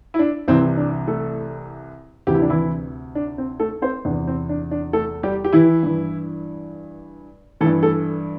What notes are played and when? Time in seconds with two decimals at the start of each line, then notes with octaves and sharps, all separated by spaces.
0.14 E4
0.19 D4
0.48 C2 C3 E3 C4
0.77 D4
1.08 A3 A4
2.27 D2 C3 E3 G4
2.34 E4
2.42 D4
2.50 E3 E4
3.15 D4
3.38 C4
3.60 A3 A4
3.82 C4 C5
4.05 E2 C3 E3 D4
4.27 C4
4.49 D4
4.71 D4
4.93 A3 A4
5.23 G3 G4
5.44 G4
5.53 E3 E4
5.83 G2 E3
7.61 E3 A3 A4
7.66 G2
7.83 A3 A4